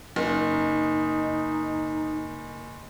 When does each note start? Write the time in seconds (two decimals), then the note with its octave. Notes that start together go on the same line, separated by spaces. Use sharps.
0.16 F#1 D#4